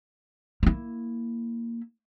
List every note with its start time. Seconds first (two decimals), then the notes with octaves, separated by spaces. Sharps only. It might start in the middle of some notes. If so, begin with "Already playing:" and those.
0.63 A#3 E4